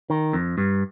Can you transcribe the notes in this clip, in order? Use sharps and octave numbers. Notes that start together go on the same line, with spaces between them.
D#3
F2
G2